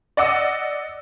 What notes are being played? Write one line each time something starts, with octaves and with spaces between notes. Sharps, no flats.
D5 D#5 F#5 D6 E6